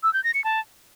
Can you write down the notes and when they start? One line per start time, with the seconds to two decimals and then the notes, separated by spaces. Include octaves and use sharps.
0.03 E6
0.14 G6
0.24 A#6
0.34 C#7
0.44 A5